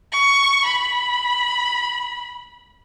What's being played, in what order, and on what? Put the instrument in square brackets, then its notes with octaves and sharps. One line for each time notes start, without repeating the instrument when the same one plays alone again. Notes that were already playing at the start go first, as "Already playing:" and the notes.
[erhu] C#6
B5